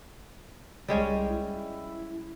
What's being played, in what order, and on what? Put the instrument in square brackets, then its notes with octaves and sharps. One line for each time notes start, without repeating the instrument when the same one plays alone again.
[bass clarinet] C2 [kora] G3 G#3 C#4
[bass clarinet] E4